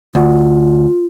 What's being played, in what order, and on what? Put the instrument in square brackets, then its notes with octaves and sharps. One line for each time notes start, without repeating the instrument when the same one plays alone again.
[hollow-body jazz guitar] D2 [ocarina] F4